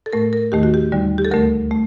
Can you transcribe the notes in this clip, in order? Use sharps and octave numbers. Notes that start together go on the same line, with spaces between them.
A4
A2 A3 A#4
A#4
D#2 D#3 A3 G4
F#4
G4
D#2 D3 G3
G4
A4
D2 D3 A3 A#4
A3